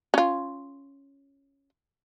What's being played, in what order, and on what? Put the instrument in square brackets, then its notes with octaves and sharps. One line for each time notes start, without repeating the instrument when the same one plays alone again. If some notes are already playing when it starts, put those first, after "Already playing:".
[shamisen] C#4 F4